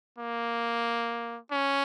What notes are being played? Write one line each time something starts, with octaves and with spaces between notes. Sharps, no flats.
A#3
C#4